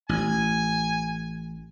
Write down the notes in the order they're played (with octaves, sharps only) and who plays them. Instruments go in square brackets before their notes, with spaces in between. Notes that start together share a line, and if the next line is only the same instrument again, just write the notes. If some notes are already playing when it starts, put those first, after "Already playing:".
[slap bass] A1 [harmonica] G#5